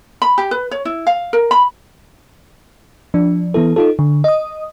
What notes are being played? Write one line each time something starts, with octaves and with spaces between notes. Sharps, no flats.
B5
G4
B4
C#5
E4
F5
A#4
B5
F3 D4
E3 B3 E4 A4
D#4 F4 A4
D3
D#5 D#6